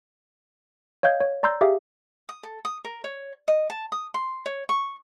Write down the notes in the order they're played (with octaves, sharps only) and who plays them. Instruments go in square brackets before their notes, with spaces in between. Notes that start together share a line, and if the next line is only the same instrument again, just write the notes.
[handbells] C#5 D#5 F5 G6 G#6
C#5
D5 A#5 C6 E6 G6
G4 G#4 E5 F5
[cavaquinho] D#6
A4
D#6
A#4
C#5
D#5
A5
D#6
C6
C#5
C#6